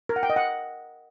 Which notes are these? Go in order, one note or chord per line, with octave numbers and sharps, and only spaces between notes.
A#4
F#5
G5
D#5
F#5